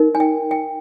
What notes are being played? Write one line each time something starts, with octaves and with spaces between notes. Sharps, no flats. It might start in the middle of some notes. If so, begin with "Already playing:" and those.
Already playing: D#4 A#4
G#5
G5
G5